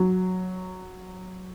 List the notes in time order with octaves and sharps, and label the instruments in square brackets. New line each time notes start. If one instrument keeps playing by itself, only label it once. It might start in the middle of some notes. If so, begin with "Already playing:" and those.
Already playing: [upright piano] F#3